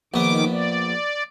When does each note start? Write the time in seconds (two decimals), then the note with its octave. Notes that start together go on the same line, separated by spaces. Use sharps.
0.14 A#1 D#3 B3 D6
0.50 D5